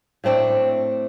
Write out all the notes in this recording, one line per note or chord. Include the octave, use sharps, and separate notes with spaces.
A2 A3 C4 D4